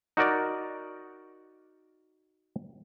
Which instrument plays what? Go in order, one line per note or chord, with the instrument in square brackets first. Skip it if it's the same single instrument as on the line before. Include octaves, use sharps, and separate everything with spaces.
[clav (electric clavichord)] D#4 F#4 A#4 D5